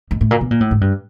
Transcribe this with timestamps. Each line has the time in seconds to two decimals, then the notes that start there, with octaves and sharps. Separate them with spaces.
0.11 G#2
0.21 A2
0.31 A#2
0.41 B2
0.51 A#2
0.60 A2
0.71 G#2
0.81 G2